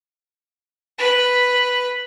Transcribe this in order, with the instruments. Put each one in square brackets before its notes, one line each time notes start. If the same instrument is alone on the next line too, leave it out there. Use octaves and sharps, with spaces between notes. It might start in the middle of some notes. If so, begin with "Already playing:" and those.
[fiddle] B4 B5